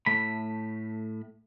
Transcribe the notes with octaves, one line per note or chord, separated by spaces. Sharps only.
A2 A3 B5